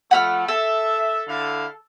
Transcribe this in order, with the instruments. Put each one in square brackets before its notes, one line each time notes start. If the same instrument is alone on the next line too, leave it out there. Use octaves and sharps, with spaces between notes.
[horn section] F3 A3 [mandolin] F#5 B5 F6
[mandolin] A4 [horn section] E5
[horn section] D3 E4 F5